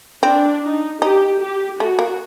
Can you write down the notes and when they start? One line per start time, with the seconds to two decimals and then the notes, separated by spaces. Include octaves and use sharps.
0.23 C4 D4
0.63 D#4
1.02 D#4 G4
1.41 G4
1.79 A3 F#4
1.99 A#3